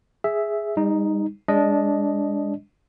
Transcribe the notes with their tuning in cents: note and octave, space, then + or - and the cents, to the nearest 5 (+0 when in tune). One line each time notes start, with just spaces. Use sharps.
G#4 +0 E5 +0
G3 +40 D#4 +0
G#3 -30 D4 -15 D#5 +0